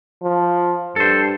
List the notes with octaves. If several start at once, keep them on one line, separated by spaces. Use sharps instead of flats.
F3
G2 A4 C5